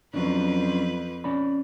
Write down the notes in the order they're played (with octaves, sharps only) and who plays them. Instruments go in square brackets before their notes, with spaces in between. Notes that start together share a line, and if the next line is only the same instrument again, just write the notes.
[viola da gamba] F2 B4 [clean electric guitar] F#3 C#4 D4
[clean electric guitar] C#4 D5 B5